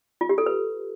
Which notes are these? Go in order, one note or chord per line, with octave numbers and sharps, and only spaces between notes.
F4
G4
A4
B4